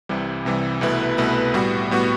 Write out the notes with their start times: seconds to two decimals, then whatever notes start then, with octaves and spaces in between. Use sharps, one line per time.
0.09 C2 C3 E3 G3
0.45 C2 C3 E3 G3
0.81 C2 B2 A3 E4 B4
1.18 C2 B2 A3 E4 B4
1.54 A2 G3 B3 F#4
1.91 A2 G3 B3 F#4